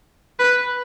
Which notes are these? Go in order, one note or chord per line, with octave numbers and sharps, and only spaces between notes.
B4